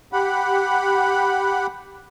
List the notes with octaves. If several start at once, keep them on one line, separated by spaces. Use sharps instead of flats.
G4 F#5 B5